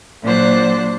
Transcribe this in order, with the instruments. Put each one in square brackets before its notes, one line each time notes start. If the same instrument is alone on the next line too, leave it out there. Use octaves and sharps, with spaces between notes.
[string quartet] A#2 F#3 D4 C5 F#6